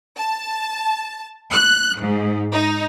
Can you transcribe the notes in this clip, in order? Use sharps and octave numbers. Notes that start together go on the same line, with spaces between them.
A5
F#6
G#2
D#4